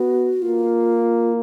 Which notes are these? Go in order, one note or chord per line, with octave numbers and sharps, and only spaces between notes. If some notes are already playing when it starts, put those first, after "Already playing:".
Already playing: B3 F#4
A#3 F4